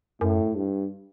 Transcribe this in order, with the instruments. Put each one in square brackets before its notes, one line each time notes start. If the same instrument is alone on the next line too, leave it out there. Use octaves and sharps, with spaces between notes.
[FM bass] F#2 [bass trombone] A2
[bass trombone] G2